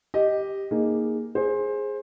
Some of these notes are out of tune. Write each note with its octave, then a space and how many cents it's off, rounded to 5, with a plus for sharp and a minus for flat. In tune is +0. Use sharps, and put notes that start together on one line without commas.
G4 +0 D#5 +0
A#3 +0 D#4 +0 G#4 +0
G#4 +0 C5 +20